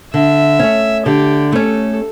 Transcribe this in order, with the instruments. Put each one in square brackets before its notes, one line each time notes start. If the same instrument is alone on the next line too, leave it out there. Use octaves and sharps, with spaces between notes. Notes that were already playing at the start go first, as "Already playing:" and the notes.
[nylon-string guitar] D3 [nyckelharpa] E5
[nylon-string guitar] A3 C#4
[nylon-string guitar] D3 [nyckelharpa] G4
[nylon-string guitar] A3 C#4 [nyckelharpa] A4